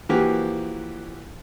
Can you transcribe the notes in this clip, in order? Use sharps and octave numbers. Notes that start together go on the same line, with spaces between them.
E3 F3 A#3 F#4 G4